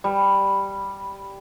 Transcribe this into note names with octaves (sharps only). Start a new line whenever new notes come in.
G3